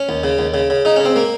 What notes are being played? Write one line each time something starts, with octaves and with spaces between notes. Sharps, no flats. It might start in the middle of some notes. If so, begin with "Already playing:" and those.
Already playing: C#4
D#2
C#3
D#2
C#3
C#3
C#3 D#4
C#3 C#4
C4
A#3